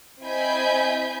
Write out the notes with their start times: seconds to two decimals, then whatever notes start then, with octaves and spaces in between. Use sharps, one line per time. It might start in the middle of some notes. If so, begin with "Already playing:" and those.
0.22 C4 E4 D#5 G#5 B5 G6